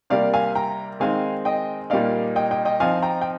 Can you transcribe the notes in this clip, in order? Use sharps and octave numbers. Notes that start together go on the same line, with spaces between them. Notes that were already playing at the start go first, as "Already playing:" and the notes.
C3 G3 A#3 D5 F5
F5 G#5
G5 A#5
D#3 G#3 C4 D#4 F5 G#5
D#5 G5
A#2 G3 A#3 D#4 D5 F5
D#5 G5
D#5 G5
D#5 G5
F3 C4 D#4 F5 G#5
G5 A#5
G5